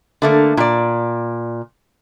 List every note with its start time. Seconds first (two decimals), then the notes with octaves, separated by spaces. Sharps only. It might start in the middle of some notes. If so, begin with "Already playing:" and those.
0.22 D3 A3 A#3
0.57 A#2 D5